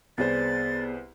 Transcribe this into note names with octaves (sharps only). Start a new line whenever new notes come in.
C2 B3 G#4 B4 C5 D5 A6